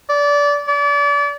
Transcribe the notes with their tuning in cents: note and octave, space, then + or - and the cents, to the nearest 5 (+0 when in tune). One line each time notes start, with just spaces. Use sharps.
D5 -25
D5 -35